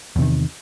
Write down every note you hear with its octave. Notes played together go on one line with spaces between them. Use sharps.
E2 C3 D#3